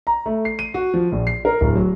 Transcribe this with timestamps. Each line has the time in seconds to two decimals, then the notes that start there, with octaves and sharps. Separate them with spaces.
0.07 A#5
0.26 A3
0.45 C7
0.59 D#7
0.74 F#4
0.94 F3
1.12 A#1
1.27 C7
1.45 A#4
1.61 D1
1.75 F#3